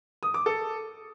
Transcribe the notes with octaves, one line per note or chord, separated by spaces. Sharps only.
D#6
D6
A4